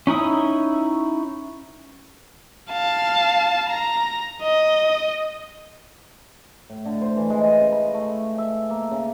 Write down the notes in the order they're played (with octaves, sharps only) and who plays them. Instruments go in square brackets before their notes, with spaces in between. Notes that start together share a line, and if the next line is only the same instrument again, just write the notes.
[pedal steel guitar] C#4 D#4 E4 D#6
[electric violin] F5 A5
A#5
D#5
[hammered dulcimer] A2
D3
C5
E3
G#3
D#5
C#3
B5
A3
E5
A#3
C#3